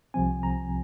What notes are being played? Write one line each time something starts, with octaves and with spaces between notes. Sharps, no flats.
C2 C3 F3 C4 G#5
A#5